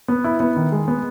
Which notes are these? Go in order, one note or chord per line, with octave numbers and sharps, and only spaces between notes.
B3
E4
B3
D#3
G#3
B3